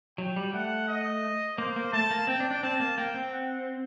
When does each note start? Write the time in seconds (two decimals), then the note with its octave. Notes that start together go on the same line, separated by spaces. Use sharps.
0.18 F#3 G5
0.36 G3
0.53 A3 F#5
0.88 D#5
1.58 A#3 C5
1.76 A#3
1.93 A3 A5
2.10 A#3
2.27 C4 G5
2.40 D4
2.51 D4
2.63 C4 A5
2.80 A#3
2.98 A#3 G5
3.14 C4
3.32 F#5